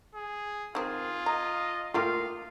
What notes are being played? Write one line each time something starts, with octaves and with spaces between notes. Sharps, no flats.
G#4
D#3 C4 F4 G#4
D#5 A#5
A3 A#3 F4 G4 F5